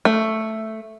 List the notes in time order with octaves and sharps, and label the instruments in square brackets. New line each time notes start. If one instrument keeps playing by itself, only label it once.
[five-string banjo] A3